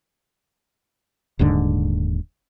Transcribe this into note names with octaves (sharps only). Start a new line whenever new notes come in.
D#1 D#2 G#2 D3